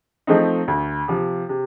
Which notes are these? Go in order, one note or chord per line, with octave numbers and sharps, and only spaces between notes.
F3 A3 C4 D#4
D2
C3 F3
C3